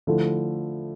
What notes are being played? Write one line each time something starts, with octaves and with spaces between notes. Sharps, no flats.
D3 F3 A3 E4 A4